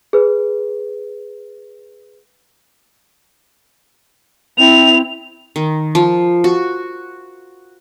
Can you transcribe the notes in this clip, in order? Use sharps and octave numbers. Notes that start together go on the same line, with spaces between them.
G#4 B4
C4 E4 F7
D#3
F3
F#4